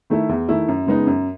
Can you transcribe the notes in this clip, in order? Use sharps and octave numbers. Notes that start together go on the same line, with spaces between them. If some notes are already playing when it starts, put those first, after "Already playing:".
D#3 A3 E4
E2
D#3 A3 E4
F#2
C#3 G#3 B3 D#4
F#2